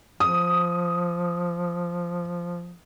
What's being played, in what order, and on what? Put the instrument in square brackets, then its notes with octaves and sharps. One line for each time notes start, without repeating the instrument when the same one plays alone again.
[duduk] F3 [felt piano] D#6